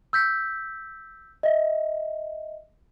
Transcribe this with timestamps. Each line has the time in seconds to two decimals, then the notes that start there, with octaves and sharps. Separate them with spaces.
0.13 E6 G6 B6
1.43 D#5 E5